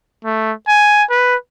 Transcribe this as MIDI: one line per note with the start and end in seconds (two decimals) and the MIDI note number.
0.25 0.52 57
0.68 1.03 80
1.10 1.35 71